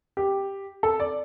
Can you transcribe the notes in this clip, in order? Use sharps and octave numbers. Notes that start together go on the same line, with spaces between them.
G4
A4
D5